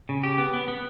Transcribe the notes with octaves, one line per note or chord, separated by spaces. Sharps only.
C#3
G4
B3
B3
B3